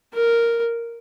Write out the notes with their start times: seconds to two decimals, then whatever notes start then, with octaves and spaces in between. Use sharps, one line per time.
0.14 A#4